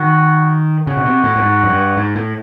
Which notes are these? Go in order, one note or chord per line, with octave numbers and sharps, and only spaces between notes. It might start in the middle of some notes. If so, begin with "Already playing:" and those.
Already playing: D#3 F#4
C#3 F#4
B2
C3
A2
A2
G#2
F#2
G2
G#2
A2